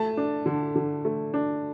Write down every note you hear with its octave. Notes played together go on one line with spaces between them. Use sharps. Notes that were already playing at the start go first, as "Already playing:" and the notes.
Already playing: A3 A5
D4
D3
D3
A3
D4